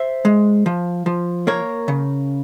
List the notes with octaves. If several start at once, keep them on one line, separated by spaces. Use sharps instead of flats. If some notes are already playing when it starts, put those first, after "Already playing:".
Already playing: C5 E5
G#3
F3
F3
A#3 A#4 C#5
C#3